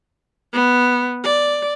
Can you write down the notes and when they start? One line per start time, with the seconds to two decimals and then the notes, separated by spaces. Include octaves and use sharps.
0.53 B3
1.24 D5